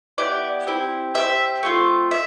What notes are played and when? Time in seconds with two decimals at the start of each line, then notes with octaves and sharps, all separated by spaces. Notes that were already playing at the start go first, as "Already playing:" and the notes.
0.18 B3 E4 G4 D5
0.67 C4 E4 G4
1.15 C4 G4 E5
1.63 A3 C4 F4
2.11 E5